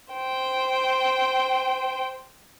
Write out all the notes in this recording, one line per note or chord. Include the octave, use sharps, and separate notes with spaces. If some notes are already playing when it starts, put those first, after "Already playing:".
C5 G5